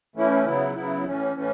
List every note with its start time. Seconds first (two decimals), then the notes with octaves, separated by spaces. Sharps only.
0.16 E3 A3 C#4 E4
0.45 C#3 F#3 B3 E4
0.75 C#3 F#3 B3 E4
1.04 A2 E3 C#4
1.34 A2 E3 C#4